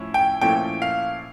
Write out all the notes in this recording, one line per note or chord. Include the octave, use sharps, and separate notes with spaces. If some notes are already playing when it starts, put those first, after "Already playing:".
Already playing: A2 F3 C#4 E4
G5
A#2 F3 A3 C#4 E4 G5
F5